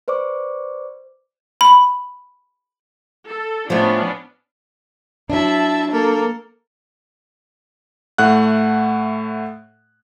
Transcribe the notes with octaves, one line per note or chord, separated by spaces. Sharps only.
B4 C5 D5 C#6 D6
B5
A4
A2 F3 B3 C#4 D4
F#3 D4 E4 E5 A5
A#3 A4 A#4
A2 A3 F#5 F#6